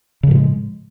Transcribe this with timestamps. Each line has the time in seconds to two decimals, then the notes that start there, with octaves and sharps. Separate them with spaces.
0.23 C#3
0.27 F3
0.31 A2
0.35 G#3